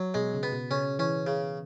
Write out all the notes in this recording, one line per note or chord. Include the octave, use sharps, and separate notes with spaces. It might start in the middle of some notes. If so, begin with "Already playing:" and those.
Already playing: F#3
B2 G#3
C#3
B3
B2
C#3 C#4
E3 C#4
C#3